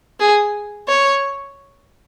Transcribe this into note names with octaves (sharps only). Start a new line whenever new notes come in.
G#4
C#5